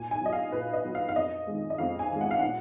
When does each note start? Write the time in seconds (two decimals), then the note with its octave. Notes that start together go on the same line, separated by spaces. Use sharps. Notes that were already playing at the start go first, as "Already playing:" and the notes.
Already playing: A#2 G#5
0.11 G#5
0.21 F#3 D#5
0.33 F5
0.52 A#2 B4
0.73 D#5
0.85 F#3
0.95 F5
1.09 F5
1.16 F2 D#5
1.47 D#3 G#3
1.70 D#5
1.78 F2 F5
1.99 G#5
2.10 D#3 G#3
2.21 F#5
2.31 F5
2.39 A#2 F#5